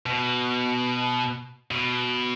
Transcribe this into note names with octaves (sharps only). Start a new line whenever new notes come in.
B2
B2